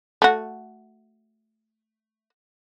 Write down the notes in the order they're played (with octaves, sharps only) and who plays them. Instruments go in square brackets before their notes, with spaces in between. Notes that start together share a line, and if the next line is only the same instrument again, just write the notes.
[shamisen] A3 F#4